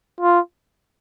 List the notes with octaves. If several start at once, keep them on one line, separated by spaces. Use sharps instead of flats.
F4